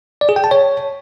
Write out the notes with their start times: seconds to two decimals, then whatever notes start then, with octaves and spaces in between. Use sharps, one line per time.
0.21 D5
0.29 G#4
0.36 G5
0.44 A5
0.51 C#5